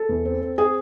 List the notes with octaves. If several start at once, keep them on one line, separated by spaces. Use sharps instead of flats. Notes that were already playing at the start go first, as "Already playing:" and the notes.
Already playing: A4
E2
C4
C4
C4 G#4